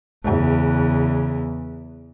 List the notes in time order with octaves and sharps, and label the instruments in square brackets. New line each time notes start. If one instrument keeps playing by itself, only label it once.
[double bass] E2 C#3